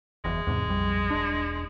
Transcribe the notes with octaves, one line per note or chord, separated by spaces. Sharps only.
F#1 E2 G#3
E2 G#2 C3
A#1 F2 G3
E1 D4